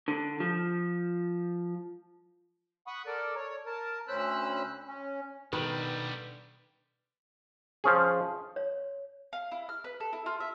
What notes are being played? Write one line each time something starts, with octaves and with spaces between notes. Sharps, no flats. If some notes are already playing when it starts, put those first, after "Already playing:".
D3
F3
F#5 B5 C#6 D#6
A4 A#4 D5
C#5
A#4 A5
D2 C#4 C5 B5 E6 F#6
C#4
B2 D3 D#3 G3 B4
F3 C#4 G#4
C#5
F5
E4
F6
B4
A4
E4
F4
E5